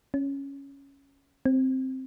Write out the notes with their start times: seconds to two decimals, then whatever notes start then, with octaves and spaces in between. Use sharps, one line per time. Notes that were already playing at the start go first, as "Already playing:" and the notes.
0.14 C#4
1.46 C4